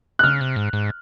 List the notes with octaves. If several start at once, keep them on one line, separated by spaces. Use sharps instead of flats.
F#6
C#3 F6
C3
G#2
G#2